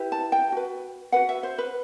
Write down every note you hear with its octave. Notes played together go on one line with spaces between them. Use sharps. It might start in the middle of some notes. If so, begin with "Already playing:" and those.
Already playing: E4 G4 B4
A5
G5
F#4 B4
F#4 B4 F#5
E5
C5
B4